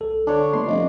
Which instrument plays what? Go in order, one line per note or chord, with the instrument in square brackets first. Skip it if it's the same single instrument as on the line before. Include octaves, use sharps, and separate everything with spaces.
[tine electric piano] C2 A4
[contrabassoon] D3 [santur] D4 C#5
[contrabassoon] G1 [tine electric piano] A3 [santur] C6
[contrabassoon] F1 [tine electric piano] C#4 D5 D#5